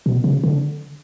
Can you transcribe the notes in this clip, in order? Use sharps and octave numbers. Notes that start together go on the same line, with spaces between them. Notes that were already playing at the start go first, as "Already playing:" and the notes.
B2
C#3
D3